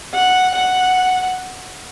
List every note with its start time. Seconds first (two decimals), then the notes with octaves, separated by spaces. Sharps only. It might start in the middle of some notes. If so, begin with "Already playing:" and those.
0.14 F#5
0.55 F#5